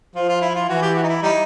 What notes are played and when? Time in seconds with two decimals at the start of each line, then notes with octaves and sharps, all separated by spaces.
0.15 F3 F4
0.29 F4
0.41 E4
0.55 F4
0.69 E3 F#4
0.82 G4
0.96 F#4
1.03 D#4
1.08 E4
1.23 G3 D#4